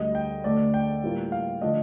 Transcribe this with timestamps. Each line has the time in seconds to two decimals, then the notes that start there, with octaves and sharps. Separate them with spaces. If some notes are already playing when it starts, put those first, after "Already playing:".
Already playing: D2 D3 G3 D#5
0.15 G5
0.44 D2 D3 A3 D5
0.74 G5
1.03 A2 G3 A#3 F4
1.32 F5
1.61 D3 F3 A3 D4 D#5